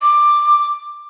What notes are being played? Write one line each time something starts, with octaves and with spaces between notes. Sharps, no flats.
D6